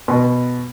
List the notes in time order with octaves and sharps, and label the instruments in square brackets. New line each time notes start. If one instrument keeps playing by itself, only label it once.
[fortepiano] B2